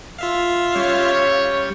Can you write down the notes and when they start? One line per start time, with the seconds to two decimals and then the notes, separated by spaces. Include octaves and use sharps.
0.19 F4 E5 F5
0.76 G3 C#4 C#5